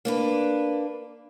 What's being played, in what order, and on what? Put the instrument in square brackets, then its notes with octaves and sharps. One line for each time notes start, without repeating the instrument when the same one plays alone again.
[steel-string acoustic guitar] A#3 D4 B4